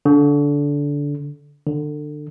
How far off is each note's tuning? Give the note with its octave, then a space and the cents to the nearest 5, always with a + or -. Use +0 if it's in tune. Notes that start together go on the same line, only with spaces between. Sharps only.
D3 -20
D3 +25